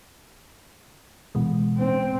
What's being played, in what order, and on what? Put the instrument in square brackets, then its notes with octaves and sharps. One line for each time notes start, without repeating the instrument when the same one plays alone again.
[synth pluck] B2 E3 G#3
[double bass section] C4